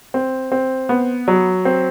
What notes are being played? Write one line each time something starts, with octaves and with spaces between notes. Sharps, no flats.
C4
C4
B3
F#3
C4